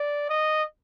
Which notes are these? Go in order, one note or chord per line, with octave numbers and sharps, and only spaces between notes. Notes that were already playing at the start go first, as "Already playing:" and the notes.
Already playing: D5
D#5